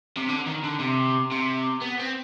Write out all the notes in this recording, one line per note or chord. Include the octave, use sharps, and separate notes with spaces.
C3
D3
D#3
D3
C3
C3
B3
C4